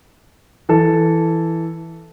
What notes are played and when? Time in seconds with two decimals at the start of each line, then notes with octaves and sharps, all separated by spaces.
0.69 E3 A4